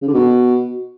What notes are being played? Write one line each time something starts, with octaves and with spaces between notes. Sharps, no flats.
C#3
D3
B2